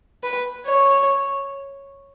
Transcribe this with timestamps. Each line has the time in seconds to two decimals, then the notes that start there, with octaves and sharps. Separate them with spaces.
0.23 B4
0.67 C#5